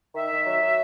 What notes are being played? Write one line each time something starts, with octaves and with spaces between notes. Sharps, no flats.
D#3 E5
D#3
F#3
F#3